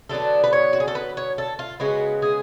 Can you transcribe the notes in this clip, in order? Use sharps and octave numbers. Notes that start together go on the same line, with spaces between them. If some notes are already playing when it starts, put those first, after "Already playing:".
D3 F#3 B3 D4 A4
B4
C#5
F#4
G#4
A4
B4
C#5
A4
F4
C#3 G#3 B3 F#4
G#4